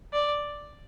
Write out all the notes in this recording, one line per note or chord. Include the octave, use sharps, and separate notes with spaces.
D5